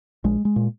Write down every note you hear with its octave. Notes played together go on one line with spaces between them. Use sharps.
A#1 G#3
G#3
A#2